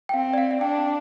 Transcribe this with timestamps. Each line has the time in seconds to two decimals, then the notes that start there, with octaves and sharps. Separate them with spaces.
0.09 G5
0.14 C4 F5
0.33 D5
0.38 F5
0.51 F5
0.61 D4 G5